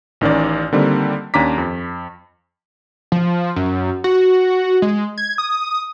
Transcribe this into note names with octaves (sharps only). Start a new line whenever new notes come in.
A1 D#3 C#4 D5
D3 D#3 G3 A#3 C4
D#2 C#4 D4 A#5 D6 B6
F2
F3
F#2
F#4
G#3
G#6
D#6